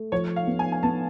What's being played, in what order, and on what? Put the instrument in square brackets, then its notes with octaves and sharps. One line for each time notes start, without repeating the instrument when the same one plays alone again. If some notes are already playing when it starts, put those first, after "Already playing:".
Already playing: [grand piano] A3
[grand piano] F3 [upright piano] C#5
[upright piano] F5
[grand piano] B3
[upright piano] G#5
G#5
[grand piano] B3 [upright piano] A5